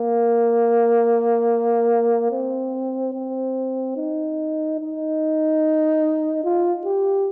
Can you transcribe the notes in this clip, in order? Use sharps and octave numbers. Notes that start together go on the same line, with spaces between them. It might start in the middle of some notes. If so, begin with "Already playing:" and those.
Already playing: A#3
C4
C4
D#4
D#4
F4
G4